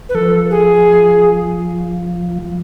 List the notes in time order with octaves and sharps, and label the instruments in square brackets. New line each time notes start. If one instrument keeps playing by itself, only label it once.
[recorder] B4
[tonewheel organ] F3 [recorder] A4
[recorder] G#4